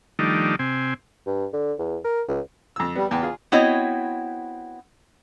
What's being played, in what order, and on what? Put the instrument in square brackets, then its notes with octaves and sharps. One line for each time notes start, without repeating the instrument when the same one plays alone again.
[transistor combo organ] D#3 F3 G3 A3 D4 D#4
C3 C4 G#5
[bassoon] G2
D3
E2
A#4
C#2
[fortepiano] F2 E6
[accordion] G3 [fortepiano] B3
[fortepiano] E2 G5 [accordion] B3
[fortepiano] F4 G#4
[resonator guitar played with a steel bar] B3 C4 E4 F#4 C#5 D#5